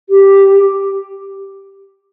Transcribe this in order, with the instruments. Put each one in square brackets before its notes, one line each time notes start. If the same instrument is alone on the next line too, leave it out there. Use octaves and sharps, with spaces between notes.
[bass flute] G4